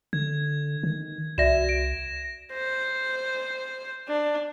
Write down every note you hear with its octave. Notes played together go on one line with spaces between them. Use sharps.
D3 G#6
D#3
C2 F#4 D5 E5 A#6 E7
D7
C5
D4